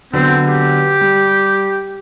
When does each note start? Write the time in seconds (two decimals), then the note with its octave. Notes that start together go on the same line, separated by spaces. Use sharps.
0.13 D3 F#3 B3 C4
0.48 G4
1.01 G3